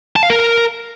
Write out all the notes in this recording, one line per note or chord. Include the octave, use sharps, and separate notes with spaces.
A5
F5
A#4